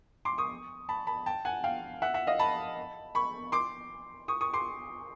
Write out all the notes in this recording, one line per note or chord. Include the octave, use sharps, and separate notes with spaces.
C6 D6
C#6 D#6
A5 B5
A5 B5
G5 A5
F#5 G#5
F5 G5
E5 F#5
E5 F#5
D#5 F5
A5 B5
B5 C#6
C6 D6
C#6 D#6
C#6 D#6
C6 D6